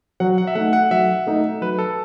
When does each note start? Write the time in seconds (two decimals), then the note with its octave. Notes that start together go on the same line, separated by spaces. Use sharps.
0.20 F#3 F#5
0.38 F#5
0.47 E5
0.55 A3 D#4 F#5
0.73 F#5
0.91 F#3 E5
1.27 A3 D#4
1.61 F#3 B4
1.79 A4